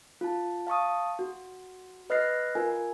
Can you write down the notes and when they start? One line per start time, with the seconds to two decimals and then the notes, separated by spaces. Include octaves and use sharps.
0.21 F4 A5
0.67 F5 A5 C#6 D#6
1.19 F#4
2.10 B4 D#5 F6 F#6 A#6 C7
2.55 F4 A#4 G#5